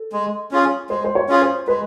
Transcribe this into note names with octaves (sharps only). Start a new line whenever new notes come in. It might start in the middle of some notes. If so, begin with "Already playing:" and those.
Already playing: A4
G#3
C#4 F4 G#4
G#3 C5
C5
C#5
C#4 F4 G#4
C5
G#3 B4